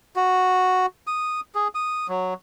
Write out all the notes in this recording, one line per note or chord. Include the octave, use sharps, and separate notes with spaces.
F#4
D#6
G#4
D#6
F#3